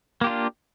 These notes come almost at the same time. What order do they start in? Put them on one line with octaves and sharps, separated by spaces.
A#3 G4 F4 D4